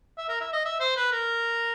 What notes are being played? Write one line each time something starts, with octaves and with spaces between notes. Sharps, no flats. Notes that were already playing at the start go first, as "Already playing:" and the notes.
E5
A#4
E5
D#5
E5
C5
B4
A#4